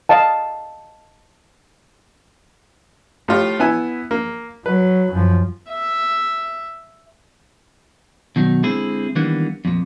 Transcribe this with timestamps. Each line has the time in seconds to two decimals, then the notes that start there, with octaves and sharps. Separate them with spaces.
0.09 D#5 F5 A5
3.28 A2 F4 G4
3.60 B3 E4 G#5
4.11 A#3
4.66 F#3 B4
5.11 F#2 F3
5.69 E5
8.36 B2 D#3 F#3 D#4
8.63 D3 G#3 C4 E4 G#4
9.15 D#3 E3 G3 A#3 B3 D4
9.65 F2 A#2